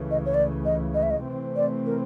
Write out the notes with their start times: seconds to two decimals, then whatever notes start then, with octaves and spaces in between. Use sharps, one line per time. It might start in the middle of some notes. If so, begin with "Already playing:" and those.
Already playing: C#2 C#3 E3 A3
0.11 D#5
0.26 C#5
0.34 D5
0.65 D#5
0.94 D#5
1.03 E5
1.10 D#5
1.25 C3 E3 A3 C4
1.56 D5
1.86 A#4